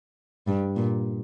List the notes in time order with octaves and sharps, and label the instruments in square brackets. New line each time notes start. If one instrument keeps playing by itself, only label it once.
[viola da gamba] G2
A#2